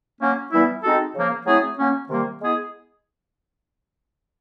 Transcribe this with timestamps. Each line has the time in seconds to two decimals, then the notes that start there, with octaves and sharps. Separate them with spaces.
0.20 F#3 A#3 C#4
0.52 E3 G3 B3 E4
0.83 G#3 C4 D#4 F#4 A4
1.15 C#3 F3 A#3
1.46 F#3 A3 C4 E4 G#4
1.78 F#3 A#3 C#4
2.09 C3 D#3 G3 A#3
2.40 G#3 B3 E4 G#4